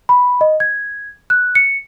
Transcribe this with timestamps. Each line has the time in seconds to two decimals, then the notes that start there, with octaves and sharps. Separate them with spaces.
0.09 B5
0.41 D#5
0.60 G#6
1.30 F#6
1.55 C#7